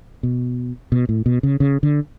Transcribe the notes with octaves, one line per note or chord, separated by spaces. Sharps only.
B2
B2
A2
B2
C#3
C#3
D3